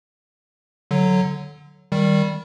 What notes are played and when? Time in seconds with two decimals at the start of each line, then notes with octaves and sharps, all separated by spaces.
0.91 D3 F#3
1.92 D#3 G3